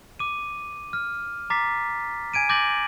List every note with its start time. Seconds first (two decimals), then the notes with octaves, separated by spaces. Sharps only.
0.19 D6 D#7
0.93 F6
1.50 A#5 D6 A6 B6 C7
2.34 G#5 G#6 D7 D#7
2.49 D6 G6 A6 A#6 F#7